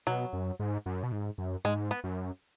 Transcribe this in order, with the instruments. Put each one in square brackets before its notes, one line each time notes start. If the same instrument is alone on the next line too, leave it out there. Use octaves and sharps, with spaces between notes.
[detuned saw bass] B2 [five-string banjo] F#3
[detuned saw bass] F#2
G#2
F#2
B2
G#2
F#2
[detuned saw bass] G#2 [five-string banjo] G#3
[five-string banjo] B3
[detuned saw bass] F#2